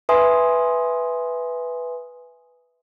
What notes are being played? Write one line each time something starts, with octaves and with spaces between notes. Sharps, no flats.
B4 E5 G#5 C6 D#6